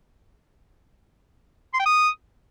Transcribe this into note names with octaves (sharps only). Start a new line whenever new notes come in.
C6
G5
D#6